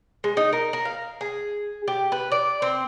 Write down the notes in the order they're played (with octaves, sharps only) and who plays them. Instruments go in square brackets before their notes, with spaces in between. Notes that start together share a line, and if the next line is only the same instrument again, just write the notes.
[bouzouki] G#3
D#4
A#4
A#4
F5
G#4
G4
B4
D5
C4